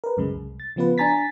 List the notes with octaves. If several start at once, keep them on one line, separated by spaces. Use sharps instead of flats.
A#4 B4
C2 F#2 C#3 G#3
C2
A6
C#3 F3 B3 F4 B4
D4 G#5 A#5 A6 B6